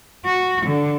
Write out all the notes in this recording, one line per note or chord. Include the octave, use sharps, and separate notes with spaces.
F#4
D3